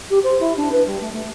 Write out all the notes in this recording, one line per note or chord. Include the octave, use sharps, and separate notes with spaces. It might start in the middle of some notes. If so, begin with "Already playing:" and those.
G4
C5
E4
D4
B4
G3
A3
A3